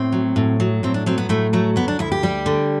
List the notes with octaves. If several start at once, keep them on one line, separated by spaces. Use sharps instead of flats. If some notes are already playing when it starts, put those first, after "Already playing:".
Already playing: A2 C4
F#3
A2
F#3
A2 C4
D4
F#3 C4
B3
A2 A3
F#3 A3
D2 B3
D4
D2 E4
G4
G3
D3